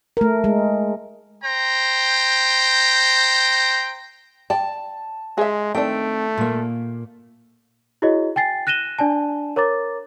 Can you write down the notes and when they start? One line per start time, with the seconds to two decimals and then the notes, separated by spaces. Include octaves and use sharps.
0.17 A3 A#4
0.44 G#3
1.43 C5 G5 A#5
4.50 D5 G5 A5
5.38 G#3 G#4 E5
5.75 D#3 A3 C4 D4 G5
6.37 A#2 A#3
8.02 E4 F#4 G#4 C#5 D#5
8.36 G5 G#5 A6 C7
8.67 F#6 A#6 D#7 E7 G7
8.99 D4 D5 G#5 A5
9.56 A#4 C#5 A#5 D6 A6